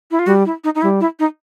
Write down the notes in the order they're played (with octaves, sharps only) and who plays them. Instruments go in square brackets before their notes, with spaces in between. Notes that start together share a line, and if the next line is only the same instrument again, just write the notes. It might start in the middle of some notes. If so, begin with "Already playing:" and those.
[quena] E4
F4
[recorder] G3 [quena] F#4
[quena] E4
D#4
D#4
[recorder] G3 [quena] E4
[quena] E4
D#4